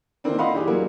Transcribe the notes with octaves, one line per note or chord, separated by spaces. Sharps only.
D#3 E3 A#3 C4 D4
D#5 F5 F#5 B5 C6
E3 D4 G4 G#4
F#3 A#3